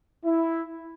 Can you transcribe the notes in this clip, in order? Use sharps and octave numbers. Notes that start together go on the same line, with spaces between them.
E4